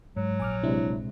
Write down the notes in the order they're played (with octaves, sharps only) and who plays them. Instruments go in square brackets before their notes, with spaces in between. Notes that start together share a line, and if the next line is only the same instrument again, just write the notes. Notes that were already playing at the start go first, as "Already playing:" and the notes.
[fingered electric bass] G#2 [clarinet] F#3
[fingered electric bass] A#1 [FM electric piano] G#5 D6 F6
[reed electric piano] C3 G#3 [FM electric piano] D4 E4